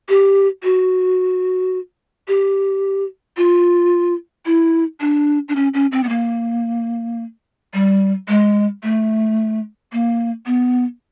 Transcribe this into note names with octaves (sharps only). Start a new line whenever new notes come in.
G4
F#4
G4
F4
E4
D4
D4
C#4
C#4
C4
B3
A#3
G3
G#3
A3
A#3
B3